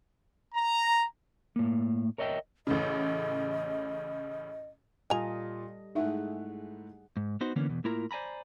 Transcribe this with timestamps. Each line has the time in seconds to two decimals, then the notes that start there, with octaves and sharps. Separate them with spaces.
0.54 A#5
1.56 A2 A#3
2.18 A#4 C#5 D#5 E5 G5
2.67 A1 A2 C#3 D#5
5.10 A#2 G3 F4 A4 D#5 G#5 A#5
5.95 G#2 A3 D#4 E4 G#4 E5 F#5
7.17 G#2
7.41 B3 D#4 F#4 C5
7.56 D3 E3 A#3 B3 C#4
7.69 E2 B2
7.84 A2 A#3 E4 F4 A#4 A#5
8.11 C5 D5 G#5 A#5 B5